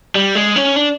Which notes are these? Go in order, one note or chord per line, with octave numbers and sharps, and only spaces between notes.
G3
G#3
C#4
D4